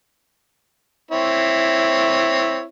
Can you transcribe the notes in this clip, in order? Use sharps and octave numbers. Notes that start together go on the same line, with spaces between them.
C4 E4 C#5